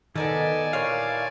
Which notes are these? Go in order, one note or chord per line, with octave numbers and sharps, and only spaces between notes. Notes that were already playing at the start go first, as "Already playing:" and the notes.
D#3 B3 D#4 A4 D5 G#5 A5
A#2 E3 C#5 F5